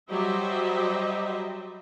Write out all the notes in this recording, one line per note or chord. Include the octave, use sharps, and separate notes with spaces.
F#3 G3 G4 C5 D#5 E5